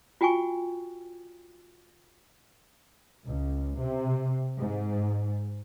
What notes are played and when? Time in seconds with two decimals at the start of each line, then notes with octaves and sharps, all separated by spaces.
0.21 F4 F#4 G5 G#5 C#6
3.27 C#2
3.80 C3
4.59 G#2